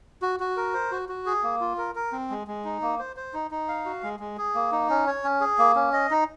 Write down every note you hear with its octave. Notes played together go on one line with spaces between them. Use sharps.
F#4
F#4
A#4
C5
F#4
F#4
G#4
A#3
F4
A#4
A#4
C4
G#3
G#3
D#4
A#3
C5
C5
D#4
D#4
F5
F#4
G#3
G#3
G#4
A#3
D#4
C#4
C#5
C#4
G#4
A#3
C#4
D#5
D#4